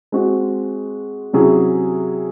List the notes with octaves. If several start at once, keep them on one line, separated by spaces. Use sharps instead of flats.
G#3 C4 F#4
C3 F#3 C#4 E4 G#4